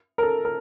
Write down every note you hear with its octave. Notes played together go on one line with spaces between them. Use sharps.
A#4
A4
A#4